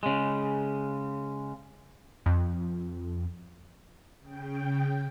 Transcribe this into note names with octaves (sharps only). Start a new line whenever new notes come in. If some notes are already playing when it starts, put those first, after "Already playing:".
C#3 G#3
F2
C#3 G5